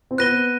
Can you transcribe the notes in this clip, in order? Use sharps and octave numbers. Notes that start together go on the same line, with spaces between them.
C4
B3 F#6 A#6 D#7 G7